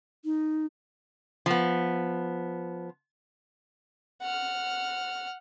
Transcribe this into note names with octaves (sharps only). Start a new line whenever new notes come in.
D#4
F3 B3
F#5 F6